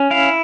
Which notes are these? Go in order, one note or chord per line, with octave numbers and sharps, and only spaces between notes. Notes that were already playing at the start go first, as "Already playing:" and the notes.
Already playing: C#4
E4 F5